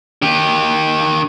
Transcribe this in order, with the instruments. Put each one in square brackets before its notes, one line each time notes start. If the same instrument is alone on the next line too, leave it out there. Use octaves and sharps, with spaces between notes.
[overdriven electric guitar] D#3 G4